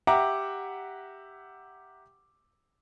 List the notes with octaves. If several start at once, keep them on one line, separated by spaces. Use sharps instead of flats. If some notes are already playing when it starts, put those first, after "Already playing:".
G4 E5 F#5 A#5 D6